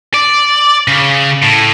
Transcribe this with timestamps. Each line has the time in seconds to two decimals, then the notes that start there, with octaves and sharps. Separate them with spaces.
0.14 D5
0.88 C#3
1.43 A2